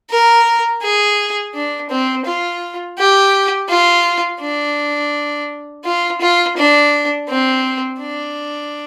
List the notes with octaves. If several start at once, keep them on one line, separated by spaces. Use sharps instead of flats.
A#4
G#4
D4
C4
F4
G4
F4
D4
F4
F4
D4
C4
D4